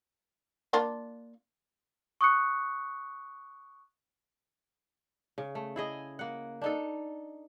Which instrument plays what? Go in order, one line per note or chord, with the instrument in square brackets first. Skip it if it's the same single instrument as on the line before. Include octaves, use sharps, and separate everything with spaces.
[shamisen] A#3 D4 F4
[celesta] C#6 D#6 F#6 C#7
[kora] C#3
A3
E4 G#4 D#5
A#3 F#5
D4 D#4 A4